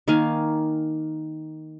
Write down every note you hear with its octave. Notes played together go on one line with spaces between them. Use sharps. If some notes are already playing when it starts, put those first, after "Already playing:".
D#3 A#3 F5 G#5